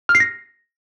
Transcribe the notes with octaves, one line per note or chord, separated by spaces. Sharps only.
F6
C7
A#6